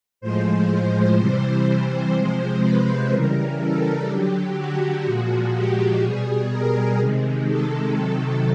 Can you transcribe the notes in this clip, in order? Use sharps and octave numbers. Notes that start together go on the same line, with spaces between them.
A2 F3 G#3 C5
C3 E3 G3
C5
C3 F3 G#3
B4
C#3 E3 G3 A#4
A4
D3 F#3 G4
F#4
A#2 F3 G#3 F#4
G4
B2 G3 G#4
A#4
C3 D#3 G#3
A4
C3 D#3 F#3